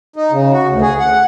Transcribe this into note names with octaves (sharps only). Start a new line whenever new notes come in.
D#4
C#3
F#4
D2
G#4
F#5